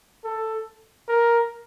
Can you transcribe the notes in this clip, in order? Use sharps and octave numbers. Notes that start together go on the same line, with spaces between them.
A4
A#4